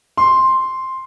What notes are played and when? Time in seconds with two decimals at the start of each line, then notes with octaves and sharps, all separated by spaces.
0.17 C6